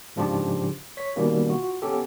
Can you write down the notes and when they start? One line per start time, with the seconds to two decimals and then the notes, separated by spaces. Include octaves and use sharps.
0.16 G#2 C#3 F3 D4 F4 G4
0.97 C#5 B6
1.16 B2 D#3 G3 A#3 C#4
1.50 F4 F#4
1.82 B3 C#4 G4 A4